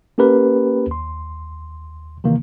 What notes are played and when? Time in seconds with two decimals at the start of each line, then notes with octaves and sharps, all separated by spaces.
0.18 A#3 C#4 G4 A#4 B4
0.87 D#2 C6
2.24 C3 D#3 E3 A#3